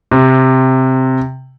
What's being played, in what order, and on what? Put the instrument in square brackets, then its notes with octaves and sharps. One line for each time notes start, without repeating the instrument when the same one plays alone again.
[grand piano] C3